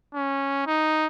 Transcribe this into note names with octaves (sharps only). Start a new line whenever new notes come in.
C#4
D#4